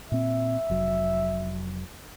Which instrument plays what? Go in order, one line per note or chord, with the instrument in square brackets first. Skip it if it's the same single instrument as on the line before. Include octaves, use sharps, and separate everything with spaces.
[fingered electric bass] A#2 C4 [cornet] E5
[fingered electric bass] F1 F#3